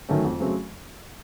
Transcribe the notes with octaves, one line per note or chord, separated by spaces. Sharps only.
D#3 F#3 A3 C#4
F2
C#3 F#3 A3 C4